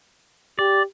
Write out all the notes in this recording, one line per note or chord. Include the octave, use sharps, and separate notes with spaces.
G4 D5